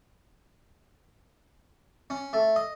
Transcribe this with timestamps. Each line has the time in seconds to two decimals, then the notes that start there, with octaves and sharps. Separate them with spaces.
2.10 C#4
2.33 A3
2.56 D#5